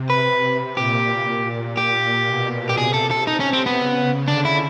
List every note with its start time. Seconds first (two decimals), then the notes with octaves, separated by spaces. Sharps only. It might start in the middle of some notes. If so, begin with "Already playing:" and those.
Already playing: C3
0.10 B4
0.77 A#2 G4
1.77 G4
2.27 B2
2.69 G4
2.78 C3 G#4
2.94 A4
3.11 A4
3.27 D#4
3.40 C#4
3.53 C4
3.66 B3
3.78 C#3
4.28 D3 D4
4.45 E4